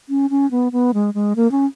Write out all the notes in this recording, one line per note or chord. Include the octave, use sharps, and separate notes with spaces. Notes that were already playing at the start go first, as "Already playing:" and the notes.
C#4
C#4
B3
B3
G#3
G#3
A#3
C#4